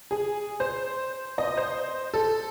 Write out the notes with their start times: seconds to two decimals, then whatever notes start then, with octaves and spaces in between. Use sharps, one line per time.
0.11 G#4
0.60 C5
1.38 D#5
1.57 C5
2.14 A4